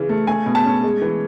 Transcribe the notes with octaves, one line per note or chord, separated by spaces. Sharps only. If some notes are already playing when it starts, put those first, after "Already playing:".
Already playing: C#3 E3
A3
A3 G#5
B2
A5
C#4
G#3
E3